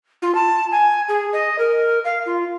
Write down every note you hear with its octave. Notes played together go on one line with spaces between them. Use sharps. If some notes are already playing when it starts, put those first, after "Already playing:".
F4
A5
G#5
G#4
D#5
A#4
F5
F4